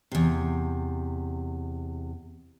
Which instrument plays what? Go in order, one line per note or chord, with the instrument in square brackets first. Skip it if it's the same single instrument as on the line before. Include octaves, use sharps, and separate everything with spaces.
[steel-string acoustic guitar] E2 C3